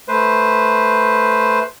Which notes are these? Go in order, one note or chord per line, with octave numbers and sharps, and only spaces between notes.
A3 B4 C5